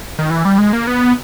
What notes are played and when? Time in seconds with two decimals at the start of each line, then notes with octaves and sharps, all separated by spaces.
0.19 D#3
0.30 E3
0.45 G3
0.58 G#3
0.73 A#3
0.87 B3